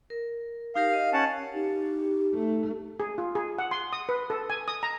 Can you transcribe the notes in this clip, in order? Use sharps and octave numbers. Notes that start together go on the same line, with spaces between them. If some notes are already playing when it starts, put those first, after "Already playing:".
A#4
D#4 G4 A#4 F5
D#5
C#4 F#5 A5
D#4 G4
A3
G#4
F4
G#4
F#5
C6
D#6
B4
A4
G#5
D#6
A#5